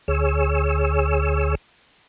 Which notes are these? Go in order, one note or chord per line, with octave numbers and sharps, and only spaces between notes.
D2 G#4 C#5 E6